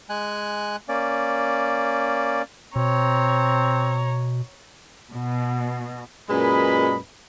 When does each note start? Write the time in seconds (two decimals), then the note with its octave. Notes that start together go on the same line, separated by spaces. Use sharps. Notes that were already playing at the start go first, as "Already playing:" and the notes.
0.10 G#3 G#5 F#6
0.89 A#3 C#4 D5
2.76 B2 C4 C#5 A#5
5.10 B2
6.29 F#2 A#2 G#3 B4 D#5 B5